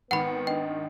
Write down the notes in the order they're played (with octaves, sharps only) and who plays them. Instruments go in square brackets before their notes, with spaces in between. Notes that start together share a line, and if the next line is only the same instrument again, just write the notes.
[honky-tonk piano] G#1 D#3 [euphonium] B3 [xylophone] F#5 B5 [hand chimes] C#7
[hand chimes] D4 D#5 [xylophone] G5